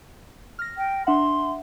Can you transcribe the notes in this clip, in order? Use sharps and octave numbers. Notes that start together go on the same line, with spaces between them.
F6 A#6
G5
D4 E5 F#5 C6